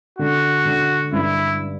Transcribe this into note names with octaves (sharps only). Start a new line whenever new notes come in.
D3 F#4
D3
G2 E4